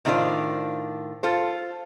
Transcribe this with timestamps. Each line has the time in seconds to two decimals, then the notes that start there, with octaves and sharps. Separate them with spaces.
0.05 A2 D#3 D4 E4 F4 C5
1.23 F4 A4 C5